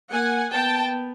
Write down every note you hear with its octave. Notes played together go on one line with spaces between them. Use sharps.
A#3 F#5 G#5
B3 G5 A5